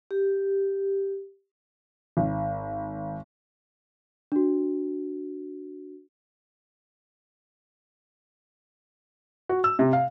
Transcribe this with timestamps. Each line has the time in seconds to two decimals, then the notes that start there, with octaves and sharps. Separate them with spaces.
0.11 G4
2.17 G#1
4.32 D4 F#4
9.49 F#4
9.64 E6
9.79 C3
9.93 F5